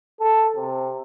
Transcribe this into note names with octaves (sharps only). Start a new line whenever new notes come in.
A4
C3